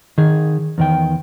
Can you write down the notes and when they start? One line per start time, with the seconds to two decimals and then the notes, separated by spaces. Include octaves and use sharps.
0.18 D#3 G#4
0.78 E2 D#3 G5